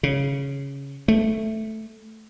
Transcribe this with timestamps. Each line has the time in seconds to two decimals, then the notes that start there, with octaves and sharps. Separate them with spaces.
0.03 C#3
1.08 A3